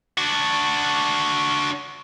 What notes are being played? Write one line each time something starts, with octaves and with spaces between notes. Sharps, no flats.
D4 F#4